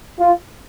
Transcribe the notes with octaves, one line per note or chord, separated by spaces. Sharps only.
F4